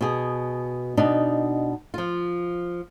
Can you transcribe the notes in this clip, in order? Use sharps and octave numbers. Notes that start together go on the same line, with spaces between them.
B2 G#4
B2 D4 D#4
F3 F4